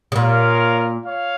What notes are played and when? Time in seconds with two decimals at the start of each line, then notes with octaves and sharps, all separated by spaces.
0.12 C#3
0.16 A#2 F4 A#4 C#5 F5
1.06 C#5 F5